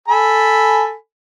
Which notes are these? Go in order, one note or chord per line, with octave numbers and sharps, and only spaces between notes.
A4 G#5 B5